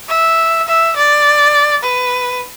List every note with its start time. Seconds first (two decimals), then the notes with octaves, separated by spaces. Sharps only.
0.09 E5
0.67 E5
0.96 D5
1.83 B4